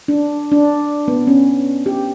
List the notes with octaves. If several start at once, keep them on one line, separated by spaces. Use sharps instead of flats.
D4
D4
B3
C#4
G4